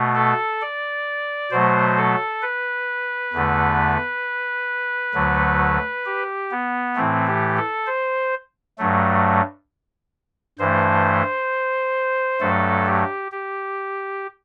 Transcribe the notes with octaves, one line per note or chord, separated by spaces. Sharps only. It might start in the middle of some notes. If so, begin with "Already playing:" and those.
Already playing: B2 A3
A4
D5
B2 F#3 A3 C5
A4
B4
E2 D3 A3
D2 D3 F#3 A3
G4
B3
A2 E3 A3 C4
G4
A4
C5
G2 F#3 A3
G2 E3 A3 C5
G2 F#3 A3 A4
G4
G4